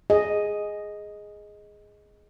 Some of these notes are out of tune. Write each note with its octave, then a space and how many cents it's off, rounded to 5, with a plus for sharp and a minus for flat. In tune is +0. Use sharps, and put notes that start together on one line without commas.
G#4 +0 D#5 +0